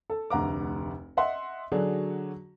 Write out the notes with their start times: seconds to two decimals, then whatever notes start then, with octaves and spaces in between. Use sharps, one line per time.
0.10 A4
0.30 F1 D2 F#5 A#5 D6
1.17 D#5 E5 F#5 C6
1.72 D3 F#3 D4 F#4 G#4